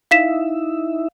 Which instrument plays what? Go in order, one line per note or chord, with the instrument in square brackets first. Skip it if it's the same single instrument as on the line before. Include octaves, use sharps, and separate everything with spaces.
[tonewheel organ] D#4 E4 E5 [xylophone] F5 B6 E7